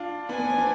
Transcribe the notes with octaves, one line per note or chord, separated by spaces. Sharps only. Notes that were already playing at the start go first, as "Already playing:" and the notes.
Already playing: D4 F4
B3 D4 G#5
B3
C4
B3 D4